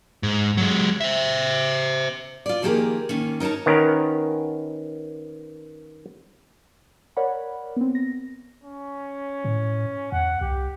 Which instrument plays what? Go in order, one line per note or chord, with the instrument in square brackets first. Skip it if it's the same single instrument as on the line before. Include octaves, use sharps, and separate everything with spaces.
[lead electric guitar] G#2
F#3 G#3
C5 E5
[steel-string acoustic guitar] F4 D5
D#3 F3 A#3 G4 G#4 A#4
D#3 A#3 C#4
D#4 A#4 C#5 A5 A#5
[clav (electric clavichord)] D#3 B3 C#4 A#4
[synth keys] A#4 C#5 D5 F#5 B5
B3 C4
A#6
[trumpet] C#4
[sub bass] A2
[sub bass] E2 [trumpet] F#5
[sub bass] C2 [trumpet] G4